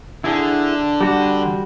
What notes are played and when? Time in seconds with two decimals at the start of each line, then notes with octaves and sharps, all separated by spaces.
0.24 D3 E4 G#4
1.01 G3 F#4